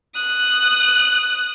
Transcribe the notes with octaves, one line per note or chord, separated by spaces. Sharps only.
D#6 F#6